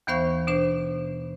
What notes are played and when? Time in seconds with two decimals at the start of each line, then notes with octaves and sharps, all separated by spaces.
0.07 D#2 E3 B3 C5 F5 C#6
0.47 B2 D4 C5